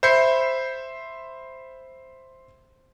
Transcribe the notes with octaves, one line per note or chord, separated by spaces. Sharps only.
C5 E5 B5 G6 C7 C#7